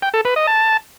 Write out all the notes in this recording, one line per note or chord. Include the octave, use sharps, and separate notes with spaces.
G5
A4
B4
D#5
A5